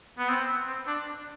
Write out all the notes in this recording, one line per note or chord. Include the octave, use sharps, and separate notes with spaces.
B3
C4
C4
D4